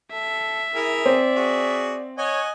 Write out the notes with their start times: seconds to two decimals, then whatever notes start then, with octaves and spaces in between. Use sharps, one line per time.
0.12 A4 E5
0.75 E4 G#4 A#4
1.06 C4 D5
1.36 F#4 G#4
2.18 C#5 D#5 F#5 G#5